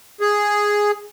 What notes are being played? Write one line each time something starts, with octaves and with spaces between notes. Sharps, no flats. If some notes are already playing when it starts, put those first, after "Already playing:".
G#4